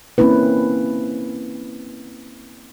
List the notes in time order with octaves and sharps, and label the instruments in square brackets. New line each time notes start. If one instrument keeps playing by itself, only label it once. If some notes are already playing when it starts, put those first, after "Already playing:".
[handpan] A#3 C4 C#4 E4 B4